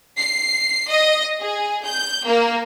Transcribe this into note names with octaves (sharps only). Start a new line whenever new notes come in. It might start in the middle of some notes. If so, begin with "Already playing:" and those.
C7
D#5
G#4
G6
A#3